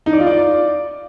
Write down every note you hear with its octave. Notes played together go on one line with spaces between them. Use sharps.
D#4
D5
F4
D5